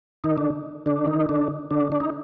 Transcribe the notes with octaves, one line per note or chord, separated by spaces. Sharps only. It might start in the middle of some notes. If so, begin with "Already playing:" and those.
D#3 D#4
D3 D4
D3 D4
D#3 D#4
D3 D4
D3 D4
D4
D#4